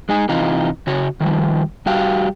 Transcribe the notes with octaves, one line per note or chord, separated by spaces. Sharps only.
G#3 D#4 G#4
C3 E3 D#4 F4
C#3 F#4 C#5
D#3 F3 G3
G3 F#4 G4 F5